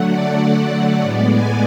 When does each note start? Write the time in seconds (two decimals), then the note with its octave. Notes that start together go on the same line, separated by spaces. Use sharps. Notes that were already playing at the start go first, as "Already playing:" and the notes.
Already playing: D3 F#3 A3 F#5
0.11 D5
0.72 D5
1.03 A2 G#3 B3
1.34 G#5